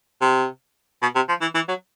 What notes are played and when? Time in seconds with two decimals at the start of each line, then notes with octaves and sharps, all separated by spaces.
0.21 C3
1.02 B2
1.15 C3
1.29 F3
1.41 E3
1.55 E3
1.68 F#3